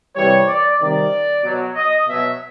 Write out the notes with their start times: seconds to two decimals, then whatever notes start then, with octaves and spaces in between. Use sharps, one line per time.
0.15 C3 E3 G3 C#5
0.47 D5
0.79 C3 D#3 G3 D5
1.43 B2 F#3
1.75 D#5
2.07 B2 F#3 E5